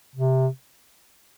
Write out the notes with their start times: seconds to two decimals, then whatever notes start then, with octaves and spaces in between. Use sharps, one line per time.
0.16 C3